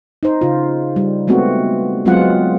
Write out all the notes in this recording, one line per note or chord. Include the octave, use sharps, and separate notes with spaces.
D#4 C5
C#3 F4
G3
G#3 A3 B3 C4 F#4
F#3 G#3 B3 C4 F4 F#5